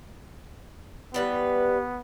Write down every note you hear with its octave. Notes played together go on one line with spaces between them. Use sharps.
E3 G3 B3 B4